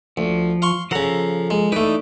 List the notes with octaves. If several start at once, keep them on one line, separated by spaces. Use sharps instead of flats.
D2 F3
F5 C6 C#6
C#3 F3 A4 F#5 A#5
G#3
E3 A3 D#4 B4 D5